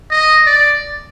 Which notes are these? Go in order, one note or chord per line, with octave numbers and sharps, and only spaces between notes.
D#5
D5